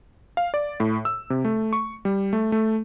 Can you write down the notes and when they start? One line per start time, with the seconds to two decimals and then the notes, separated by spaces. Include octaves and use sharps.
0.37 F5
0.54 D5
0.80 A2
1.05 E6
1.30 C3
1.45 A3
1.73 C#6
2.05 G3
2.33 A3
2.52 A3